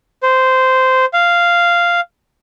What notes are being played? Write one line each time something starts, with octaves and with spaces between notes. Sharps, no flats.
C5
F5